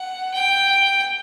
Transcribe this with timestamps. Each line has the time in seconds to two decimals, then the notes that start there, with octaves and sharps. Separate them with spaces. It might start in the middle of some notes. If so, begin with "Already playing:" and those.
Already playing: F#5
0.34 G5